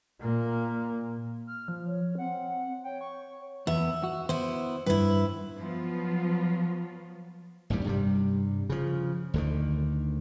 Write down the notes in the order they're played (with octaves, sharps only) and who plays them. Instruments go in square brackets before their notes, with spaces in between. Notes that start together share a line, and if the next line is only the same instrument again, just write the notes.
[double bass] A#2 A#3
[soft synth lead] F6
F3
[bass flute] C#5
[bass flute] C4 [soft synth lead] F#5
[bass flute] C#5 [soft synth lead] G5
[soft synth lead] C#6
[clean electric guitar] E2 B3 [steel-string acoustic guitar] E5
[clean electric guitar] F#4
[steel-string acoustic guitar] B3 E4 [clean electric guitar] C5
[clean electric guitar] G2 [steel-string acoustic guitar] E4 B4
[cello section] F3 F#3 B3 F4
[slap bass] G#1 D#2 A2 G3
G2 C3 G3
C#3 F3
D2 D3 D#3